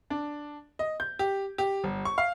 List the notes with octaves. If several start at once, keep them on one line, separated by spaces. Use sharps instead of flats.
D4
D#5
G6
G4
G4
G1
C#6
F5